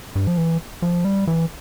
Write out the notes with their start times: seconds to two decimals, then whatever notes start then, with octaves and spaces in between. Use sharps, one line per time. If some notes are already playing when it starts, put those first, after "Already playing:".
0.16 G2
0.27 F3
0.37 E3
0.82 F3
1.05 G3
1.27 E3